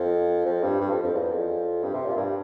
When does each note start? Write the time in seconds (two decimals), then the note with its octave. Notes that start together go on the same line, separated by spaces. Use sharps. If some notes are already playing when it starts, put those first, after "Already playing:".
Already playing: F2
0.46 F2
0.63 G2
0.80 G2
0.91 F2
1.03 F2
1.15 E2
1.32 F2
1.83 G2
1.94 C3
2.06 A#2
2.17 G2